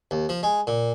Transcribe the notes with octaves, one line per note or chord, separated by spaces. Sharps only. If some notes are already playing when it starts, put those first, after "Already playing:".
D#2
F3
G#3
A#2